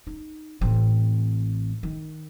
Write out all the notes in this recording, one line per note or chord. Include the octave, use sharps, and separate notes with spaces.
D#4
A1 C4
D#3